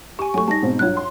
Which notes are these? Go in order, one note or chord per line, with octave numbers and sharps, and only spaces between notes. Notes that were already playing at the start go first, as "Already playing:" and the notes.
G4 G#5 C#6
F#3 A3 G#5 C#6
G3 D#4 A5 A#6
G#2 B2 C4
G2 F#3 F4 C#5 F#6
C6